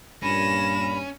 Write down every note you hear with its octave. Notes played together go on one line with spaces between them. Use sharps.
G2 A#2 C#4 B5 A#6 E7